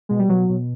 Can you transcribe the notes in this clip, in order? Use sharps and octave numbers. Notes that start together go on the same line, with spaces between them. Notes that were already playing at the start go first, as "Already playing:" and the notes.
B2 G#3
G3
B2 F#3
B2